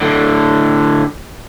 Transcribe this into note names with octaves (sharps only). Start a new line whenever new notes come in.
A2 D3